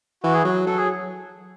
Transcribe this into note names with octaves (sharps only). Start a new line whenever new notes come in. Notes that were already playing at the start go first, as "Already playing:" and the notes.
E3 F#4
G#4
F#3 F#4
F#3 A4
G#4